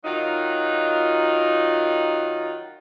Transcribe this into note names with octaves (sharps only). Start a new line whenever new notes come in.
D#3 F#3 D#4 F4